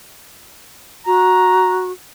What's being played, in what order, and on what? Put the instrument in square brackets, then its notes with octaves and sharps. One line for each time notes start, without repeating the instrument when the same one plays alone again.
[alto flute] F#4 [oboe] A#5